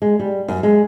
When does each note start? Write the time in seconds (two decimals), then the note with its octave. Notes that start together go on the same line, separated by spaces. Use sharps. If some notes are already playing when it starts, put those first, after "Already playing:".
0.02 G#3
0.20 G3
0.48 F#2
0.63 G#3